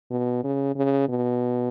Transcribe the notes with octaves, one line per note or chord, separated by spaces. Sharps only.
B2
C#3
C#3
B2